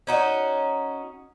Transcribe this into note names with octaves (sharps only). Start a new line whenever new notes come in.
C#4 D#4 F#4